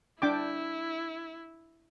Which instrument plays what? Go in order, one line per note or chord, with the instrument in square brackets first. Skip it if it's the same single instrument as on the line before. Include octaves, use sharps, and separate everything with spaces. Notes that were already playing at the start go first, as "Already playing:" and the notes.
[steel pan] D4 G5 D6 [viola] E4